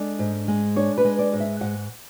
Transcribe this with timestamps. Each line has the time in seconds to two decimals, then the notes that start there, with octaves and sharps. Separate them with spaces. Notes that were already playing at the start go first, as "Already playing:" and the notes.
Already playing: G#3 D4 A4
0.19 G#2
0.48 G#3
0.76 D4 C#5
0.98 B4
1.05 G#3
1.19 D5
1.33 G#2
1.40 E5
1.61 G#2 F#5